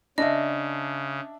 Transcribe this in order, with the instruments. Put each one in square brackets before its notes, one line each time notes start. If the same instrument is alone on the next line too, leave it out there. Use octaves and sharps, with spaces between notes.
[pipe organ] C#3 [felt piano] D4 E5 [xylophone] D#5